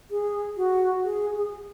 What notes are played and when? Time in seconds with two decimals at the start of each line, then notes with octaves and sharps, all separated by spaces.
0.11 G#4
0.57 F#4
1.04 G#4
1.35 G#4